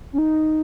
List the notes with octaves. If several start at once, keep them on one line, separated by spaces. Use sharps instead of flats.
C#4
D#4